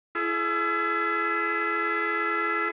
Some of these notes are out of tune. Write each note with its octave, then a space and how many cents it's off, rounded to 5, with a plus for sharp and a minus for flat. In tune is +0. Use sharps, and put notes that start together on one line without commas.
E4 +35 G#4 +40